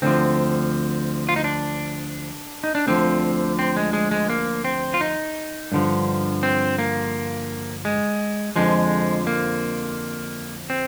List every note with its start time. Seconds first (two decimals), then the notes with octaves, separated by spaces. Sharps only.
0.02 D2 D3 F3 C4
1.29 F4
1.36 D#4
1.44 D4
2.64 D#4
2.75 D4
2.87 D2 D3 F3 C4
3.59 C4
3.77 G#3
3.93 G#3
4.11 G#3
4.30 A#3
4.65 C4
4.94 F4
5.01 D#4
5.72 G2 D3 F3
6.43 C4
6.78 A#3
7.85 G#3
8.56 F2 D3 F3 G#3
9.27 A#3
10.70 C4